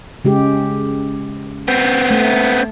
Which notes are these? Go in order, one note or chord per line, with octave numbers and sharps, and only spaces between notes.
C#3 G#3 G4
B3 C4
A3